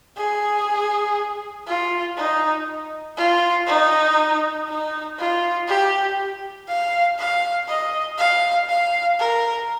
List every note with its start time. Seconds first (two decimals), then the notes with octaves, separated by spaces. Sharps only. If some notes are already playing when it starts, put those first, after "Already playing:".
0.17 G#4
1.67 F4
2.17 D#4
3.17 F4
3.67 D#4
4.68 D#4
5.18 F4
5.68 G4
6.68 F5
7.19 F5
7.68 D#5
8.18 F5
8.69 F5
9.19 A#4